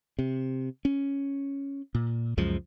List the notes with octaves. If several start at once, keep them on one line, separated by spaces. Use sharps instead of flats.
C3
C#4
A#2
C#2 F#2 F3 G#3